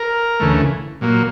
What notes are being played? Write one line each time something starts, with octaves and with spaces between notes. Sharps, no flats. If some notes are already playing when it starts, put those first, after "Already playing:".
Already playing: A#4
D2 C#3 E3 A3
A#2 F#3 A#3